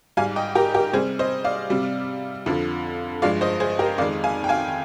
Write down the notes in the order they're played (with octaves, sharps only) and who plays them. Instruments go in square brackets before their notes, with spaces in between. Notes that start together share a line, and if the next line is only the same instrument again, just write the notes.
[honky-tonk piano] G#2 G3 F5 G#5
D#5 G5
G4 A#4
G4 A#4
C3 G3 G#4 C5
C5 D#5
D5 F5
C3 G3
F2 D3 F3
G2 F3 G#3 D5 F5
C5 D#5
G#4 C5
G4 A#4
F2 D#3 G#3 D5 F5
F5 G#5
G5
F5 G#5